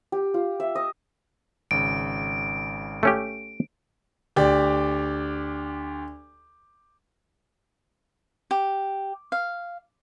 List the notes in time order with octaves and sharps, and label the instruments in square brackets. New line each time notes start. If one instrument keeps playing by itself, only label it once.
[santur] G4
F4
E5
D#5
[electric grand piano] G#1 C#3 [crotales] D7
[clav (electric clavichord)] A3 C#4 G4
[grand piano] D2 G4 D5
[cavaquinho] G4
F5